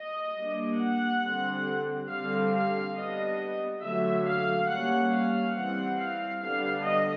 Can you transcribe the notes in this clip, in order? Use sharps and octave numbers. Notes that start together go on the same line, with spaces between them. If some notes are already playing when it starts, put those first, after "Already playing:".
Already playing: D#5
G3 A#3 D4
F#5
D3 G3 C4
D3 G3 C4 F5
F5
G3 B3 D4 D#5
D3 F#3 A3 E5
F5
G3 A#3 C#4 F#5
F5
E3 G3 C4 F#5
F5
D3 G3 B3 D4 F5
D#5